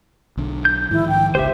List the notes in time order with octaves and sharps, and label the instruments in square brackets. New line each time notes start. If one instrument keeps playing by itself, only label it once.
[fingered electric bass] B1 D3
[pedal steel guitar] G6
[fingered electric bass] G#2 D#3 F3 [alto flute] E4
[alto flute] G5
[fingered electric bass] G#1 C#2 [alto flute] G4 [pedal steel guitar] C5 E5